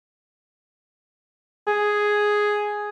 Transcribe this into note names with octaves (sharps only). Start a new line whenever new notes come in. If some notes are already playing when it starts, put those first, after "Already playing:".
G#4